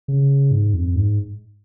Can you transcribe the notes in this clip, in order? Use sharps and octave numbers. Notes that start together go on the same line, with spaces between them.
C#3
G#2
F2
G#2